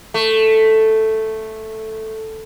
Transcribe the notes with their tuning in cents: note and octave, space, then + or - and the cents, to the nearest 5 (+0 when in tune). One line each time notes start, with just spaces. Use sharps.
A3 +0